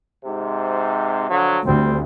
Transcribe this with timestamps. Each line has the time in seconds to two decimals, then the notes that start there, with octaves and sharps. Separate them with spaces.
0.25 G#2 C3
1.30 D3 F3 F#3
1.67 D2 G3 C4